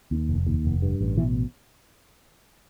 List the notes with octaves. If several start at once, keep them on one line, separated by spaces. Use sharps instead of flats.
D#2
F1
D#2
F1
G2
A1
B2 E3